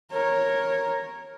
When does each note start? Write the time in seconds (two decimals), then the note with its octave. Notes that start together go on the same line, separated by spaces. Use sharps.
0.11 A#4 C#5